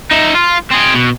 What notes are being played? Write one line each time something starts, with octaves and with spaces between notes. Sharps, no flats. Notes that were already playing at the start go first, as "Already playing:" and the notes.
D#4 E5
F4
C4 G#4
B2